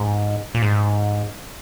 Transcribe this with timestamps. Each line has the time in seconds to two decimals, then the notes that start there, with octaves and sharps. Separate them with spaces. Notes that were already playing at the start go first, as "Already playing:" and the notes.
Already playing: G#2
0.55 A#2
0.62 G#2